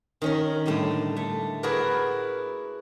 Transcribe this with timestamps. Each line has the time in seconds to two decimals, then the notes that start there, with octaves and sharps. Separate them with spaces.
0.22 D#3 C#4 A#4
0.66 A2 D3 G3 A3
1.16 A3
1.63 E4 F#4 G#4 A#4 B4 D5